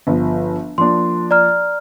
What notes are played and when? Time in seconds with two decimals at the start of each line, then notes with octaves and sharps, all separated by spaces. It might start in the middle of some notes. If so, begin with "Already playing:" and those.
0.07 G1 F3
0.78 F3 A#3 D4 C6
1.31 D5 A#5 F6